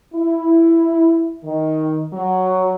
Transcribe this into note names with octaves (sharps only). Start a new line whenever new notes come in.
E4
D#3
F#3